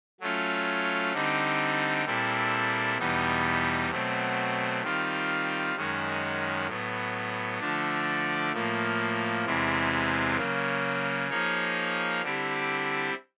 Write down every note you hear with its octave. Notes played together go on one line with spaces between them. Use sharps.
F#3 A3 C#4 F4
D3 G3 C4 D#4
A#2 G3 C4 E4 A4
E2 B2 G3 B3 D#4
B2 F#3 A3 C4
D#3 G3 C4 F4
F#2 D#3 G#3 C#4 F#4
A2 F#3 B3
D3 F3 A3 D4
A2 F3 A#3
E2 C3 E3 G#3 C4
C#3 F#3 A#3
F3 A#3 D#4 G#4 C#5
D3 G3 C4 E4 G4